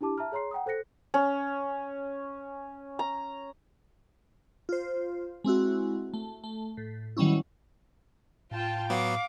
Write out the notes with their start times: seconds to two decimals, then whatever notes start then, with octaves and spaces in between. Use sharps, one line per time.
0.01 D4 E4 G4 A5 D6
0.18 E5 A5 A#5 F6
0.32 G#4 C#5 A#5 C6 C7
0.51 F#5 G5 A#5 D#6
0.66 A4 C5 F#6 A#6 C#7
1.14 C#4
2.99 A#5
4.69 F4 C5
5.44 G#3 C4 E4 F#4
6.14 A3
6.44 A3
6.77 A2
7.17 D#3 F#3 G3 B3 C#4 E4
8.51 A2 F4 G5 A5
8.90 F#3 B3 F5 D6